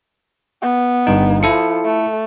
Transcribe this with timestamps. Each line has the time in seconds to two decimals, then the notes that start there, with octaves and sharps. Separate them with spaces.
0.62 B3
1.07 G1 G2 D#4
1.43 F3 E4 A4 C#7
1.84 A3